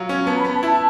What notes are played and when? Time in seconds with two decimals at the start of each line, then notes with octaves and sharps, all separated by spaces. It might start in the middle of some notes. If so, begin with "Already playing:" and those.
Already playing: F#3 F4
0.09 C#4
0.26 B3 A5
0.36 A#5
0.40 B3 B5
0.54 A5
0.63 E4
0.68 A5